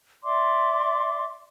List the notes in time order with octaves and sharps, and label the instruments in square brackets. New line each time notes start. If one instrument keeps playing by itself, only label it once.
[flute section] D5 E5 C6 D6